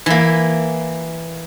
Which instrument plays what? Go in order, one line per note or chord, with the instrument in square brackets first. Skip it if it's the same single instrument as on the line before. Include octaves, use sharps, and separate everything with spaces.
[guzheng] E3 A#3